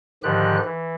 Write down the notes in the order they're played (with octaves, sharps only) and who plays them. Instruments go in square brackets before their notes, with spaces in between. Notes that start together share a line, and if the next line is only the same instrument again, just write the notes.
[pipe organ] G#2 D3 D#3 F3 G4 F#6
E3